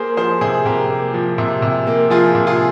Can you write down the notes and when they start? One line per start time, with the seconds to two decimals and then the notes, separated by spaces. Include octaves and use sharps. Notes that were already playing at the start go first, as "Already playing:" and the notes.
Already playing: A#3 G#4 C5
0.17 F3 G#4 C5
0.41 C3 G#4 C5
0.65 C3 G4 A#4
0.90 A#3
1.14 F3
1.38 C3
1.62 C3
1.87 A#3
2.10 F3 F4 G#4
2.35 C3
2.47 F4 G#4